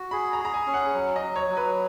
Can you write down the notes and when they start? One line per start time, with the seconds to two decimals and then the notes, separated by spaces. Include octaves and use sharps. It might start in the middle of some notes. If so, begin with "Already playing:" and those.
Already playing: F#4
0.11 G#4 B5
0.33 A#5
0.40 G#4
0.45 A#5
0.54 G#5
0.66 C#4
0.74 F#5
0.94 F#3
1.16 D#5
1.22 F#3
1.36 C#5
1.50 F#3
1.57 B4